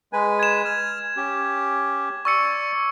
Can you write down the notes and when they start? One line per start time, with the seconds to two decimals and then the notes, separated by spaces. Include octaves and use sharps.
0.13 G#3 B4 G#5
0.39 G#6 E7
0.65 F6
1.17 C#4 G4
2.25 D5 C#6 E6 C#7